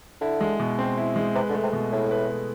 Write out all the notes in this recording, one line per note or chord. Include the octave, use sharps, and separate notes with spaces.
D3 E4
G#3
B2
C4
E4
G#3
C3 B4
D3
A3
C3
B2
A2 E4
B4
A3